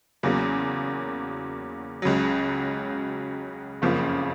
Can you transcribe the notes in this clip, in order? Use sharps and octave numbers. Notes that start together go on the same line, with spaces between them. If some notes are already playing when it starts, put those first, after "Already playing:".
E2 C#3 F#3 A#3
C#2 C#3 F#3
F#1 F2 C#3 F3 A#3